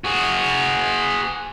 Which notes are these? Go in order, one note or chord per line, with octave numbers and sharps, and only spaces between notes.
F#4 G#4